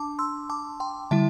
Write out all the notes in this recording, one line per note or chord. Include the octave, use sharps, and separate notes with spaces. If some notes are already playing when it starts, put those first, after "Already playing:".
Already playing: D4 A5 D6
C6 E6
A5 D6
G5 C6
D3 G3 E4 E5 A5